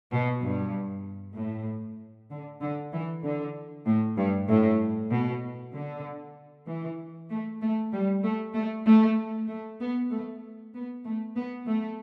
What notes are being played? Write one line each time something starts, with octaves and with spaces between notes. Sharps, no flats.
B2
G2
A2
D3
D3
E3
D3
A2
G2
A2
B2
D3
E3
A3
A3
G3
A3
A3
A3
A3
B3
A3
B3
A3
B3
A3